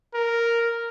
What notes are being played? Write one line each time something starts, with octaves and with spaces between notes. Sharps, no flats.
A#4